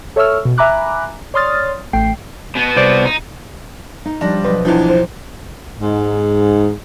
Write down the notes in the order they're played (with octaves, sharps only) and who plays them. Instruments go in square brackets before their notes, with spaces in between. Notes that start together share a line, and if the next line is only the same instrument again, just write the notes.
[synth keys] A4 C#5 E5 C#6 E6 F6
B2
E5 G#5 A#5 B5 D6 F#6
C#5 D5 C6 D#6 F6 A6
A1 A3 G5 C7
[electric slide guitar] B2 B3
[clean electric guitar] C2 C5 D5
[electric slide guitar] D#4
[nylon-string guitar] D#4
[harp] F3 A#6 [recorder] G3 [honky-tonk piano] D4
[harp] B1 C5 D#5 [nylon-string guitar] B4
[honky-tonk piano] E2 E3 F3 [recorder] D4
[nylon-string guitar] C5 [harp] D7
[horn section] G#2